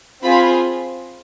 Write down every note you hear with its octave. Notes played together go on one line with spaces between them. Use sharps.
C4 F4 G#4 B5